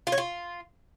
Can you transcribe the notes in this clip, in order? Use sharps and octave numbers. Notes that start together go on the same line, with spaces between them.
F4
C#5
F4